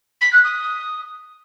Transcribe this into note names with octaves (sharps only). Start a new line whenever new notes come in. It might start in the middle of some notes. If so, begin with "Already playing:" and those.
B6
F#6
D#6